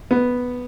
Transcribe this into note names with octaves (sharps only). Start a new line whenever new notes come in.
B3